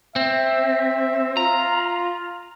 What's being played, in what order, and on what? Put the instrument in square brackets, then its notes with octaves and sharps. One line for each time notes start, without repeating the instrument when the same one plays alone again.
[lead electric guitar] C4 [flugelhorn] E5
[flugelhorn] F4 [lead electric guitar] A#5